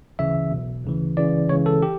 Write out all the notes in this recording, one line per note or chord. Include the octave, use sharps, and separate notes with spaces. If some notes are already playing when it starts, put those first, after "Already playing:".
D2 C#3 E3 E5
B1 B2
D2 C#3 E3
C#2 C#3 E3 D5
C#2 C#3 E3 C#5
A4
G4